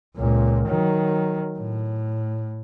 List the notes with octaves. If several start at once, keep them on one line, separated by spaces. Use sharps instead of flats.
C#2 A#2
D#3 F#3
A2